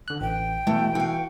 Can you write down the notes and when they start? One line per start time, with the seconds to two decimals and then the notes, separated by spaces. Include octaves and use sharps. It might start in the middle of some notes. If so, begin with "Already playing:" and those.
0.08 D3 F#6
0.21 A1 G5
0.67 B2 E3 A3
0.95 E3 F#4 F5